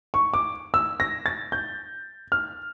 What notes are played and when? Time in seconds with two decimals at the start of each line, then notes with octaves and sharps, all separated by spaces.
0.14 C#6
0.34 D6
0.74 E6
1.00 A#6
1.26 A6
1.52 G6
2.32 F6